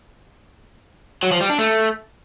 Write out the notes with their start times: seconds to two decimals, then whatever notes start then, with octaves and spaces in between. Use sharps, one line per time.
1.23 F#3
1.32 F3
1.41 G3
1.50 D4
1.59 A3